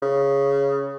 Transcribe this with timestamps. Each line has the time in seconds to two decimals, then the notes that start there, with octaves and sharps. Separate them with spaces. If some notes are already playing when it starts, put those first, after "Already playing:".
0.02 C#3